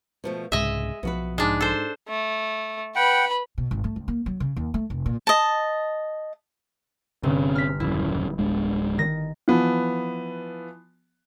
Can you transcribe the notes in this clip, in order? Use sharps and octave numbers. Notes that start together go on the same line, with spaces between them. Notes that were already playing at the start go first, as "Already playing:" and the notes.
B2 F3 A3
C2 G#2 C#3 G#3 D#5 E5
B1 F3 B3 F#4 B4
G#2 G#3 D4
A4 C5
A3
B4 F#5 G5 B5
B2
G#1
A3
C#2
A#3
F#3
C#3
D#2
A3
F1
A#2
D#5 A5
G1 C3 C#4
F6 B6
D#1 F#2 E4
D1 G#3 D4
D#3 A#6
E3 F3 B3